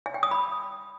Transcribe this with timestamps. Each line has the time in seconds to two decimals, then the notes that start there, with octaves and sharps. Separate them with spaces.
0.06 G#5
0.14 G5
0.23 D#6
0.31 B5